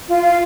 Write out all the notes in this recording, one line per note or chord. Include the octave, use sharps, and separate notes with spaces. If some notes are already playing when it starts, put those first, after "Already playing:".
F4
F4